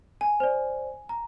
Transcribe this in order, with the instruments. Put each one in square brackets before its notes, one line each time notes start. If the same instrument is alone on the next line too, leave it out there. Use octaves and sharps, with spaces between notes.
[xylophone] G#5
[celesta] C5 D5
A#5